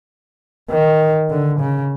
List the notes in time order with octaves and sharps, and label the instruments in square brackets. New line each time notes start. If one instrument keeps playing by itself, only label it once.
[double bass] D#3
D3
C#3